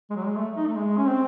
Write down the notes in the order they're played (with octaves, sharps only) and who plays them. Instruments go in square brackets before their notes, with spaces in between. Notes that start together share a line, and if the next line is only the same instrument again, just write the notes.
[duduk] G#3
F#3
G#3
A3
D#4
A3
G#3
C#4
C4